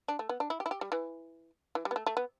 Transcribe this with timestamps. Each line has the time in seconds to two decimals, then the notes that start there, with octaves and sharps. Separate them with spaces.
0.08 D4
0.19 A3
0.29 B3
0.40 D4
0.50 E4
0.60 G4
0.66 E4
0.71 G4
0.81 G3
0.92 E3
1.75 E3
1.85 G3
1.91 B3
1.96 A3
2.06 A3
2.17 B3